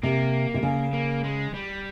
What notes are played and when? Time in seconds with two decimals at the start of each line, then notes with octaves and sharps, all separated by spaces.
0.03 C3 A#3
0.54 C3
0.63 C#3
0.93 A#3
1.24 G#3
1.54 G3